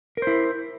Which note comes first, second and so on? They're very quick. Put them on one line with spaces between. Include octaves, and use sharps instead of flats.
A#4 C5 E4